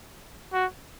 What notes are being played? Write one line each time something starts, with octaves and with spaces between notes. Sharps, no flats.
F#4